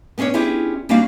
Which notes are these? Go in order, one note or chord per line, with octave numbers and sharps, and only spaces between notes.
B3 C#4 D4 C5 C#5
C#4 D4 E4 F4 G4 G#4
G3 A#3 C#4 D4 F#4 F5